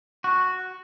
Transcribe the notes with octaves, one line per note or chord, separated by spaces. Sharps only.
F#4